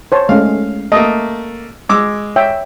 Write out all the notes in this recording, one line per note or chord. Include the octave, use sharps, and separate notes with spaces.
C5 C#5 A5
G#3 A3 C#4 F5
A3 A#3 D#5
G#3 D6 E6
C#5 E5 G5